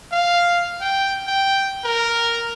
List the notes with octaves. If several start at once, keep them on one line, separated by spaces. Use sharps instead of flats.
F5
G5
G5
A#4